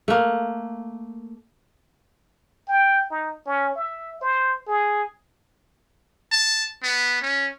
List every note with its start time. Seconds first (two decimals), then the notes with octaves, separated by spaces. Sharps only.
0.08 A3 A#3
2.68 G5
3.10 D#4
3.46 C#4
3.75 E5
4.21 C5
4.67 G#4
6.32 A5
6.83 B3
7.22 C#4